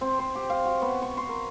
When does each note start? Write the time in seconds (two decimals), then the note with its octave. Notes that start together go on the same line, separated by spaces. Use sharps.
0.01 C4
0.19 C5
0.35 G4
0.50 F5
0.65 F#4
0.82 B3
1.02 C#6
1.17 C6
1.29 A#4